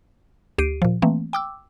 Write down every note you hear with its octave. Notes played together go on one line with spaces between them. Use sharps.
D2 G4 C7 D7 D#7
A#2 F3
E3 A3 A#3 C4
G5 D6 E6